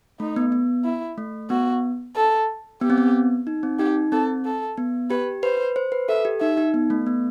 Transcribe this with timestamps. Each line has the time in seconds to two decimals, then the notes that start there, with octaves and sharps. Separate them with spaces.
0.20 A3 D#4
0.36 B3
0.52 B3
0.85 E4
1.18 A3
1.50 B3 F#4
2.16 A4
2.81 B3 G4
2.90 C4
2.98 B3
3.47 D#4
3.63 C4
3.79 D#4 G4
4.12 C4 A4
4.45 A4
4.77 B3
5.10 G4 B4
5.43 B4 C5
5.76 C5
5.92 B4
6.09 A4 E5
6.25 G4
6.41 D#4 E5
6.57 D#4
6.74 B3
6.90 A3
7.07 B3